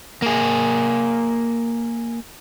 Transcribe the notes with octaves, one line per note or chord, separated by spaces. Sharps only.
A#3 G#4